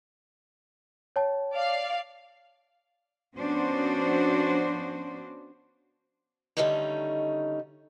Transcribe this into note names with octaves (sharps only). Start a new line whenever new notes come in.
C#5 G5 A5
D5 F5
F3 B3 C#4 D4 F#4 C5
D3 D#3 G3 A3 C#4 D#4